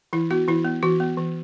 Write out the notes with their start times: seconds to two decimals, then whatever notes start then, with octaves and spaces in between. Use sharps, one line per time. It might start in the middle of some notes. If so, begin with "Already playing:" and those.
0.13 E3 E4
0.31 B3 F#4
0.48 E3 E4
0.65 B3
0.83 E3 F#4
1.00 B3
1.18 E3